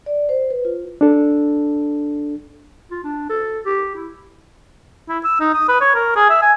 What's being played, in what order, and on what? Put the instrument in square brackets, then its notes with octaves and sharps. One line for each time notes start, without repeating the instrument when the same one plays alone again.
[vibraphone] D5
C5
B4
F4
[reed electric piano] D4 A4
[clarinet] F4
D4
A4
G4
E4
[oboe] E4
E6
D#4
D#6
B4
C#5
A#4
G#4
E5
G#5